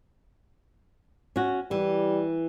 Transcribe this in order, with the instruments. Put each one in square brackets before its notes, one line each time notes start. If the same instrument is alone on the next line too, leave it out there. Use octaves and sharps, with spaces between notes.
[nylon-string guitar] C#4 F#4
[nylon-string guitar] E3 [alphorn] G3